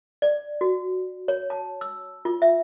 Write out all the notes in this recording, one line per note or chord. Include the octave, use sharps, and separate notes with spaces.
D5
F#4
C#5
A5
E6
F4
E5